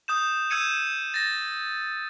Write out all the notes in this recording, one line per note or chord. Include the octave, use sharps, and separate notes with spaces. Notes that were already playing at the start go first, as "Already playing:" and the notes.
D#6 G6 E7
E6 G6 G#6 C#7 D#7 E7
A6 A#6